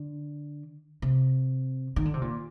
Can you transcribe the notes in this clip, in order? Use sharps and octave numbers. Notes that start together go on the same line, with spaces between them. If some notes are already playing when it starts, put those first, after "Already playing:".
Already playing: D3
C3
D#3
D3
C3
A#2